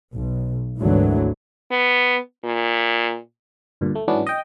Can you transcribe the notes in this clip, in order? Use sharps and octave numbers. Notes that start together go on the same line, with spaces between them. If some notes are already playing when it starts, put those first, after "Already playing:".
B1
G#1 D2 G#2 D3 E3 F#3
B3
A#2
D2 G2 A#2
A3
G#2 E3 F#3 B3 C#4 D4
D#5 G5